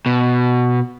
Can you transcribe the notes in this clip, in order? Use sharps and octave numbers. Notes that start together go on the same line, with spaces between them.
B2